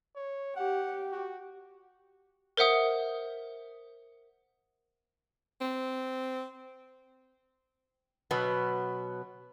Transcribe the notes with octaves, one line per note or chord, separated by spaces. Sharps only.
C#5
G4 F#5
F#4
A#4 C5 E5 F#5 D#6
C4
B2 F#3 B3